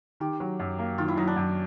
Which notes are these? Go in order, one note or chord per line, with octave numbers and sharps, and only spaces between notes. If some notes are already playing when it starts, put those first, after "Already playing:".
D#3 G4
F#3
F#2
A#3
D#3 F4
E4
F#3 D#4
D4
F#2